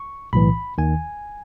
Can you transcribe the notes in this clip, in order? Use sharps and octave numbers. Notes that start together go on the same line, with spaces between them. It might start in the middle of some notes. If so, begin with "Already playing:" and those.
Already playing: C#6
B1 A2 E3 B5
D#2 D#3 G#5